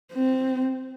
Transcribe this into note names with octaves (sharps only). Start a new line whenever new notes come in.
C4